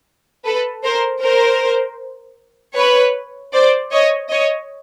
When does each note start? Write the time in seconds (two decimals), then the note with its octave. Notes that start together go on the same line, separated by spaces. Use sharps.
0.45 A4 B4
0.84 A#4 C5
1.22 A#4 C5
2.76 B4 C#5
3.53 C5 D5
3.92 C#5 D#5
4.30 C#5 D#5